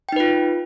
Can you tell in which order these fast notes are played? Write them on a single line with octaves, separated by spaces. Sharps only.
G5 D#4 B4 F4